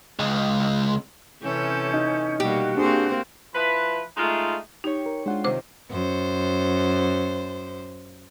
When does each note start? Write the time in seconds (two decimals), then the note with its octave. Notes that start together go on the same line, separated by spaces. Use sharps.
0.19 C#2 G#3
1.43 C3 E3 C#4 A4 G6
1.93 D#4
2.40 B2 G3 A#3 F#4 G4
2.77 A#3 C4 D4 G#4 C5
3.55 F3 E4 B4
4.17 G#3 A3 D#4 F4
4.84 D#4 G4 C#5
5.06 A#4
5.26 G#3 D4 F4 C5 F#5
5.44 C3 D#3 C5 D6
5.91 F#2 C5